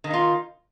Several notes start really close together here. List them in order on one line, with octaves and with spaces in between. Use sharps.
D#3 A#3 D#4 F4